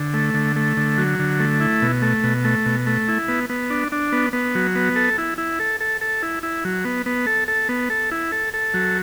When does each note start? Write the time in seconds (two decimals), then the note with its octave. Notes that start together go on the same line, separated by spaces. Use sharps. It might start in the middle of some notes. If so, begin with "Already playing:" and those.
Already playing: D3
0.14 A3
0.34 D3
0.56 A3
0.77 D3
0.98 F#3
1.19 D3
1.40 A3
1.60 E4
1.82 B2
2.02 A3
2.24 B2
2.45 A3
2.66 B2
2.87 A3
3.08 E4
3.28 B3
3.50 B3
3.70 D4
3.92 D4
4.12 B3
4.33 B3
4.55 F#3
4.75 B3
4.96 A4
5.18 E4
5.38 E4
5.60 A4
5.80 A4
6.01 A4
6.22 E4
6.43 E4
6.65 F#3
6.85 B3
7.06 B3
7.27 A4
7.48 A4
7.69 B3
7.90 A4
8.11 E4
8.32 A4
8.54 A4
8.74 F#3